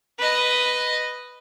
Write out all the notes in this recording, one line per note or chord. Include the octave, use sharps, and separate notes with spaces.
B4 D#5